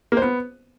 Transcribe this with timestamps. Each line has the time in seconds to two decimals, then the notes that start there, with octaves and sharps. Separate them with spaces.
0.12 A#3
0.17 C5
0.22 B3